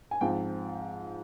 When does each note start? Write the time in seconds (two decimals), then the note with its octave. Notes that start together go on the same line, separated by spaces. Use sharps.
0.11 G#5
0.21 G#2 F3 C4 F4 G5